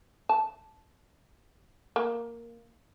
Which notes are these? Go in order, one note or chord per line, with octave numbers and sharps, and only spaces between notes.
A5
A#3